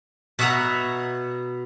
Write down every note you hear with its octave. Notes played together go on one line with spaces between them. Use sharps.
B2 B4 C#5 E5 F#5 A#5